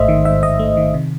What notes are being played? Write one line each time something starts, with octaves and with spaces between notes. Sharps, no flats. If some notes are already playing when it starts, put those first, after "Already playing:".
Already playing: A1 G#2 A3 C5 D#5 E5
D#3
G#2 E5
A1 D#5
A3
D#3
C3